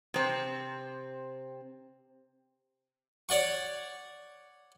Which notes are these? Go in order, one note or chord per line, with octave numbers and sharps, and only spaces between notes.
C3 C4
C#5 D5 F#5 C#6